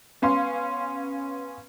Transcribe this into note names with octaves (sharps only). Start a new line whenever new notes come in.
B3 C#4 F5 C6